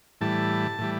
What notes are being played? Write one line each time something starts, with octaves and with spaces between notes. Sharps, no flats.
A2 E3 G3 A5
A2 E3 G3